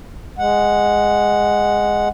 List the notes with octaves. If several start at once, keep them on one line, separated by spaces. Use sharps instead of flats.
G#3 F#5